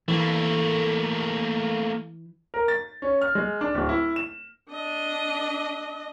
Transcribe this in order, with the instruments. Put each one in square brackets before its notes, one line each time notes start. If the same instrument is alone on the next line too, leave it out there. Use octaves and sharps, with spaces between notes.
[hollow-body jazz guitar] E3 [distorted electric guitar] A3 A#3
[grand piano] A#4
A6
C#4
F6
G#3
D4
D1
E4
E7
[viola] D4 D#5